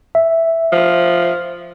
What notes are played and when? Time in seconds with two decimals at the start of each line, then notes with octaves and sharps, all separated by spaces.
0.15 E5
0.72 F3